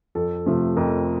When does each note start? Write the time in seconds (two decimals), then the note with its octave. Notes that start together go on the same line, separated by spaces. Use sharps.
0.15 F2 A4
0.46 C3 F3 A3
0.77 F2 A#4